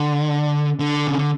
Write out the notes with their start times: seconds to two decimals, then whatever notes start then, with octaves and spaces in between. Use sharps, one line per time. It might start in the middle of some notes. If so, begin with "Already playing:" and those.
Already playing: D3
0.79 D3
1.07 C#3
1.19 D3